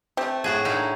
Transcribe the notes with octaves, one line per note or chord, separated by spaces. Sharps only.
A3 C4 G4
A2 F#4 G#4
D3 A#3 D#4 E4 F#5